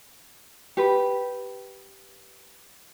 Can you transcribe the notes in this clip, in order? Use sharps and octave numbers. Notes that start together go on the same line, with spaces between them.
G4 B4